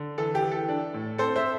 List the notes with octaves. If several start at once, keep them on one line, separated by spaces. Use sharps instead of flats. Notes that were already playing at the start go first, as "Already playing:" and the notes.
Already playing: D3
E3 A4
G4
E3
A4
D4
A2
C4 A4 C5
C5 E5